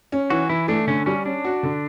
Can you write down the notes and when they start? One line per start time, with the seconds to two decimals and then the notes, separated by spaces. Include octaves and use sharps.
0.12 C#4
0.30 E3 F#4
0.49 E3 E4
0.68 A3 D4
0.87 D3 C#4
1.06 G3 C#4
1.25 C#4 D4
1.45 F#4
1.63 D3